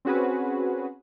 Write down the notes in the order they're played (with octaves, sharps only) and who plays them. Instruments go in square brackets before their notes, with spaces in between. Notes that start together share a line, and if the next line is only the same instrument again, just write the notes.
[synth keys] C4 C#4 F#4 G#4 B4